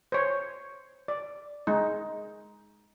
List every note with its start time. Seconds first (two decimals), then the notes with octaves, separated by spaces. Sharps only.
0.12 C5 C#5
1.08 D5
1.67 G#3 D#4